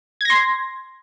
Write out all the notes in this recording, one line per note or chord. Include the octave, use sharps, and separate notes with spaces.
C6 G#6 A#6